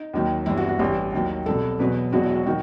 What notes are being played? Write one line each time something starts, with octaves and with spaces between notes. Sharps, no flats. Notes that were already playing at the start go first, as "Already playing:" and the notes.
Already playing: D#4
D#2 D#3 F#3
G1 G2 E3 E4
F#4
F#4
A1 G2 E3 G4
D#2 D#3 F#3
C2 B2 F#3 A4
E2 B2 F#3 B4
E1 E2 B2 F#3 F#4
E4
F#4
D#3 F#3 F#4